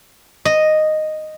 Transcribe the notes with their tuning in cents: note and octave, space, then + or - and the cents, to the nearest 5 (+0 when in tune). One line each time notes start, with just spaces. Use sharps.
D#5 -5